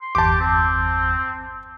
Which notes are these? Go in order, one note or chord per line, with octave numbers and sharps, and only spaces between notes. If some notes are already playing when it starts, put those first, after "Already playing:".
C6
G1 E2 G4 A5 C6 D6
C4